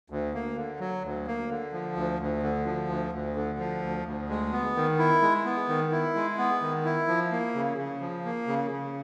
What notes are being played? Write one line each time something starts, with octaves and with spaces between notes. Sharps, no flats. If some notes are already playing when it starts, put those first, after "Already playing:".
D2
A#3
D3
F#3
D2
A#3
D3
F3
D2
D2
D3
F3
D2
D2
D3
F3
D2
D2
G#3
B3
D#3
E4
G#3
B3
D#3
E4
G#3
B3
D#3
E4
F3
A#3
C#3
C#3
F3
A#3
C#3
C#3